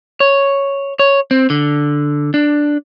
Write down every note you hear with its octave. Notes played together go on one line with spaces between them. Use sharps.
C#5
C#5
C4
D3
D4